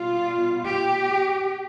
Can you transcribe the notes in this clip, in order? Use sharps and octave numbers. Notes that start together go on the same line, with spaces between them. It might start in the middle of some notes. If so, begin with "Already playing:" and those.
Already playing: B2 G3 F4
G4